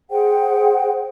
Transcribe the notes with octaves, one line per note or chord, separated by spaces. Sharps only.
G#4 C5 F#5 G5